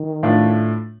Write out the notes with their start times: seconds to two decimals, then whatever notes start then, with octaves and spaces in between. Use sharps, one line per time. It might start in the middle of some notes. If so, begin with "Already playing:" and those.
Already playing: D#3
0.23 A2 A3 D4 F4